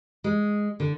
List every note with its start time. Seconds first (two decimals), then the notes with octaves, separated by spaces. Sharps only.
0.24 G#3
0.80 D3